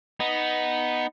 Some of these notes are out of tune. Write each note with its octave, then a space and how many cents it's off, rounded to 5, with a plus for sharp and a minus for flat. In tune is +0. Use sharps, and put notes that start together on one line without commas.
B3 +0 D#4 +0